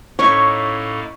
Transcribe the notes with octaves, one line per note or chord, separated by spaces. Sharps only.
A2 A#3 C#4 D#4 E4 A4 C#5